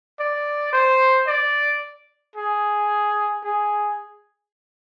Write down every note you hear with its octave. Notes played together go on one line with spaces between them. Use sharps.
D5
C5
D5
G#4
G#4